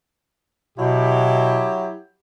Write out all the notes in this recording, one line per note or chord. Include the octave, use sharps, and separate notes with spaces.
B2 F#3 E4 G4